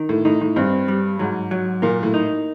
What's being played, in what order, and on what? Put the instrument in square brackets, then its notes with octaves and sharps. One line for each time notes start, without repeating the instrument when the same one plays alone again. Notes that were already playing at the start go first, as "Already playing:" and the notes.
Already playing: [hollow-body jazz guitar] D#3
[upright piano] A2
[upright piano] A2 [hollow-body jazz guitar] D#4
[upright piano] A2
[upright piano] G2 [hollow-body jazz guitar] C4
[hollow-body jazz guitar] G3
[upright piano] G#2 [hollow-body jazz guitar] F#3
[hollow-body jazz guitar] F#3
[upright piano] A#2 [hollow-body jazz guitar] A#3
[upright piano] A2
[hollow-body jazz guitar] D#4